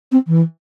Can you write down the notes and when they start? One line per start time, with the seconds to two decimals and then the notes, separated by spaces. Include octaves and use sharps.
0.12 C4
0.27 E3